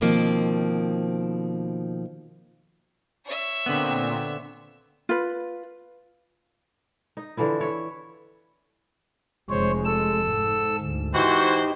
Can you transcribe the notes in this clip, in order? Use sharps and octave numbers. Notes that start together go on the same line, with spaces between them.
B2 D#3 F3 A#3 C4
C#5 E5
A#2 D3 B3 C4
F4 B4
D#4
D3 E3 F3 E4
E4 C#5
F1 G#3 C5 C#5
A4 E6
G#2
D2
E3 D#4 F#4 G4 C5